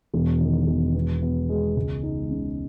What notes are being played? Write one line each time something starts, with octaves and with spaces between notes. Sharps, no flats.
E1
D#3
E1
B3
B3
G#3
C#2
D#4
C#3